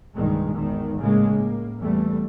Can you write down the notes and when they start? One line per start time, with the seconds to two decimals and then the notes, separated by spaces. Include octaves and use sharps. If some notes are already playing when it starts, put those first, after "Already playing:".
0.15 C2 G2 A#2 D#3 G#3
0.54 G#1 E2 D#3
0.98 A2 C#3 G#3 A#3
1.35 A2 A#3
1.80 E2 E3 G3 A3